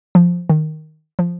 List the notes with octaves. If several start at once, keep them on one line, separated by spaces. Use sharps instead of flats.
F3
D#3
F3